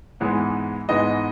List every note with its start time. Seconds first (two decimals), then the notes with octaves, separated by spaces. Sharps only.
0.20 G#2 E3 G#3 B3
0.89 G#2 E3 G#3 B3 D#5